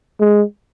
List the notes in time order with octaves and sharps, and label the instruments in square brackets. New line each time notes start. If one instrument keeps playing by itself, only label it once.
[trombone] G#3